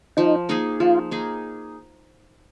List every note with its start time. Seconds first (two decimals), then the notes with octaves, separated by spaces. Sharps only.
0.17 F3 D#4
0.49 A#3 D#4 G#4
0.80 F3 F4
1.11 A#3 D#4 G#4